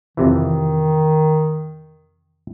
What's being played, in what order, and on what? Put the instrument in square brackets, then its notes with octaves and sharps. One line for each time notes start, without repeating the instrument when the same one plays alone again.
[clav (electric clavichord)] F2 C3 E3 [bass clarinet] D#3